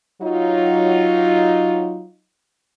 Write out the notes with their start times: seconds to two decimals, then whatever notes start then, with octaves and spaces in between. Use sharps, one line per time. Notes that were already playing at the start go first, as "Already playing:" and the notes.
0.22 F#3 D#4 F4